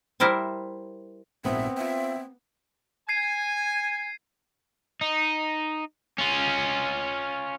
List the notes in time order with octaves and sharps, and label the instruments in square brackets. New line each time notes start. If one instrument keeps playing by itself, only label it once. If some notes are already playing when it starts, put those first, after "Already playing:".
[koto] G3 E4 A#4 C5 A5
[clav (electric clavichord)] A#1 G#2 F3 [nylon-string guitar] B3 [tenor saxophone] C4 [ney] E5
[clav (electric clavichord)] F4 G5 [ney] E5
[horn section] G#5 [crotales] G#6 C7 D#7
[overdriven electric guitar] D#4
C#4 F4